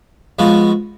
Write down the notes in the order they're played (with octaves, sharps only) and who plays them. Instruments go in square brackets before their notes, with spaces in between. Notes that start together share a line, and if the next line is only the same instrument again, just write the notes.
[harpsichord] G#2 F3 B3 F#4